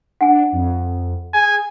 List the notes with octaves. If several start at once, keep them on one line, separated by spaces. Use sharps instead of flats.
D4 F#5 G#5
F2
G#4 G#5